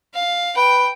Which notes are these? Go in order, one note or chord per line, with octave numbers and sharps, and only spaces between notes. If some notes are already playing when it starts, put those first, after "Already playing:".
F5
B4 G5